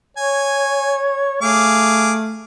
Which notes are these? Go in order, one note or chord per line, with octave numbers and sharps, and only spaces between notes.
C#5 G#5
A3 G#4 F5 D6